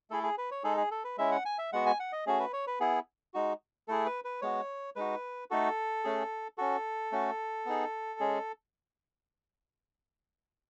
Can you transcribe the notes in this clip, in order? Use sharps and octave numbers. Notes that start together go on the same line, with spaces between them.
A3 E4 G#4 A4
G#4
B4
C#5
G#3 D#4 G#4 A4
G#4
A4
B4
G#3 C#4 E4 E5
F#5
G#5
E5
G#3 B3 F#4 F#5
G#5
F#5
D#5
A3 C#4 F#4 G#4
B4
C#5
B4
B3 E4 G#4
G#3 D#4 F#4
A3 E4 G#4 A4
B4
B4
G#3 B3 F#4 C#5
G#3 D#4 F#4 B4
A3 D#4 F#4 A4
A3 C#4 G#4
C#4 F#4 A4
A3 C#4 F#4
B3 D#4 G#4
G#3 C#4 G#4